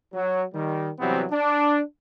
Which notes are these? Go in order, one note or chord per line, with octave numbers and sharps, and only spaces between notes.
F#3
D#3 G3
C3 E3 F#3 G3 B3 C4
D4